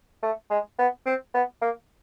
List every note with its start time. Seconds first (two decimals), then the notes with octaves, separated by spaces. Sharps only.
0.23 A3
0.50 G#3
0.79 B3
1.06 C4
1.34 B3
1.62 A#3